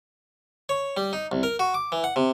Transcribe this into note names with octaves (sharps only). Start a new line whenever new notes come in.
C#5
G3
D#4
C2
A#4
F#4
D6
E3
F#5
C3